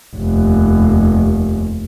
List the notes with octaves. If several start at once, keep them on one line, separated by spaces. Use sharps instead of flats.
F1 D#2